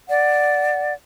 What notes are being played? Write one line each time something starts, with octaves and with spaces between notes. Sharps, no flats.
D5 F#5